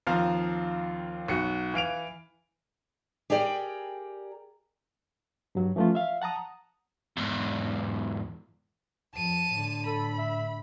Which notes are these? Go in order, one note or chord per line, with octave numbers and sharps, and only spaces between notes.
D#2 F3 C4 F5 A#5
B1 F#4 C#7
E3 F5 D7 F7
G4 G#4 A#4 D5 G5
G2 F#3
E3 F3 A3 C#4 F4
E5 F5
F#5 A5 A#5 D#6
E2 G#2
F2 A5 D#7
A2 D3
A4 B5
E5